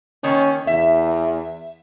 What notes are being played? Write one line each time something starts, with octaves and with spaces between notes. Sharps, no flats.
D#3 A#3 C#4
E2 E5